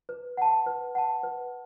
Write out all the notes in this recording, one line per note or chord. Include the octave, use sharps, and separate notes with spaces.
B4
F#5 A5
B4
F#5 A5
B4